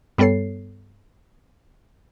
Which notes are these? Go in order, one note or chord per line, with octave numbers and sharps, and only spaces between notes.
G2 G3 B3 A4 C#5 C7